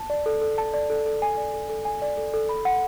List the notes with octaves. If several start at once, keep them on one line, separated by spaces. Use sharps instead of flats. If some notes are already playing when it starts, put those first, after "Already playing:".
Already playing: A5
D5
A4
A4
A5
D5
A4
A4
G#5
D5
A4
A4
G#5
D5
A4
A4
B5
F#5